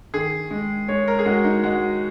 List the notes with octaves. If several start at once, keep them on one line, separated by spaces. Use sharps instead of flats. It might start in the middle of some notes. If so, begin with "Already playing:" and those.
D#3 G#4
G#3
G#3 C#5
A#4
G#4
G#3 F#4
D#4
G#3 F#4